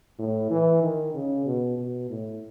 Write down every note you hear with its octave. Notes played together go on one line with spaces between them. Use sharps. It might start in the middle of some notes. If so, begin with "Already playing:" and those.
A2
E3
D#3
C#3
B2
B2
A2